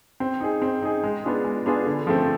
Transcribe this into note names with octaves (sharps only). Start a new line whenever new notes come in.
C4
D#4 G#4
C4
D#4 G#4
G#3
B3 D4 F4 G#4
G#3
B3 D4 F4 G#4
D3
F3 A3 C4